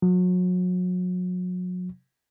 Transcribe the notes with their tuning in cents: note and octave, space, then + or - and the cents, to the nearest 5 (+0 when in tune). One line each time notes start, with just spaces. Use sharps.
F#3 -35